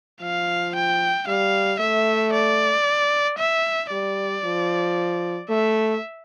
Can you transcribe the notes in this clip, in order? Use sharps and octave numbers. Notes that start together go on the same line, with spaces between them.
F3 F5
G5
G3 F5
A3 E5
D5
E5
G3 D5
F3
A3 E5